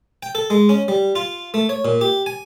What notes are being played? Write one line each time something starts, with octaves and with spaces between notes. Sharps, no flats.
G5
A4
G#3
C#4
G3
F4
A3
C#5
A#2
G4
G#5